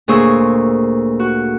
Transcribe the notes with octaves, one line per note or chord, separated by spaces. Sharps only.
D2 A#2 G#4 C5 C#6 E6
F#4